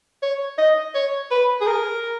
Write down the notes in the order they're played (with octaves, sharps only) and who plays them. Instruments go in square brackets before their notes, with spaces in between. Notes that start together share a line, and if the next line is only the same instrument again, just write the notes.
[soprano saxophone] C#5
D#5
C#5
B4
G#4
A#4